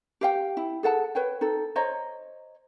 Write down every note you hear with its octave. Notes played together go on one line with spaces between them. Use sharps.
G4 F5 G5
E4
G#4 A4 F#5 A5
B4 C#5 G5
D#4 A4
C5 C#5 D#5 A#5